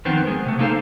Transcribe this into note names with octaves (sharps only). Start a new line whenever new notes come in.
F2 D#3 B3 C4
G#3 G#4
C3 A3
A#3 D#4 A4 C5 F5